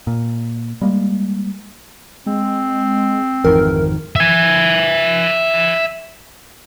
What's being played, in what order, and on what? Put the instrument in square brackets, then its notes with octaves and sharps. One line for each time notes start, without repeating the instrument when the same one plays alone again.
[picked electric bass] A#2
G3 G#3 A#3
[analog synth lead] G#3 [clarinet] C4
[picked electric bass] G#1 F2 D#3 [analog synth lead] E3 [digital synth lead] A#4
[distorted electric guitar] E5 G#5